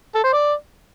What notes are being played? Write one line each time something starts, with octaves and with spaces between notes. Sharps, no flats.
A4
C5
D5